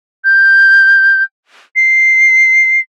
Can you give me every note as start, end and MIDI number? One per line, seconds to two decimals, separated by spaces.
0.25 1.23 91
1.76 2.81 96